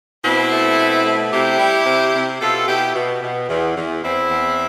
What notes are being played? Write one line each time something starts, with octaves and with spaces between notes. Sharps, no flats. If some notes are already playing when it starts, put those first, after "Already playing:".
B2 C4 E4
A3
B2
A3
C3 E4 G4
G3
C3
C3
B2 F4 A4
B2 E4 G4
B2
B2
E2
E2
E2 C4 E4
E2